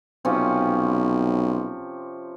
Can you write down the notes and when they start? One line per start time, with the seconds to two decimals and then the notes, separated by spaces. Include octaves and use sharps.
0.25 B1 C3 F3 C#4